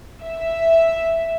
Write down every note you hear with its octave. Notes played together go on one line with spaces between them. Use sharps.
E5